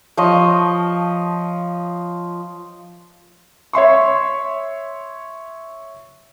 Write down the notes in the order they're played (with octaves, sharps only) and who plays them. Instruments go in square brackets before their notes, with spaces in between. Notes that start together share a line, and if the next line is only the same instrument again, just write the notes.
[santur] F3 C#5 D#5
[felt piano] C#5 E5 C6 C#6